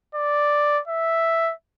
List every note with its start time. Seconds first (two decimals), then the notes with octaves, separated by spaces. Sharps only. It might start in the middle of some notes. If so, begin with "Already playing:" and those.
0.15 D5
0.88 E5